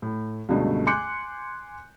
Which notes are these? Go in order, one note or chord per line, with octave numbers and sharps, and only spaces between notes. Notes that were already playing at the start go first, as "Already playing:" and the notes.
A2
C#2 G2 B2 D3 A3
G#5 C6 D6 F#6 G6 C#7